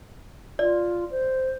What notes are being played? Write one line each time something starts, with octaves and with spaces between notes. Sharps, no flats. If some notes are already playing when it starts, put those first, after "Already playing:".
F4 D5
C5